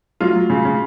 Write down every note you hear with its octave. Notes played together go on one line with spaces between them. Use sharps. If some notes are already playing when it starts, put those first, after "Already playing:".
F#3 F4
F#3
C#3
C#3